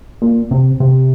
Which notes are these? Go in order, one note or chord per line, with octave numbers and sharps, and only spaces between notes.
A#2
C3
C3